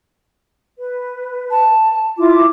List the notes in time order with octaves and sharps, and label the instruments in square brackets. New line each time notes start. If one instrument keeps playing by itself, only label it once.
[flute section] B4
[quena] A5
[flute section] E4 D6 [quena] F4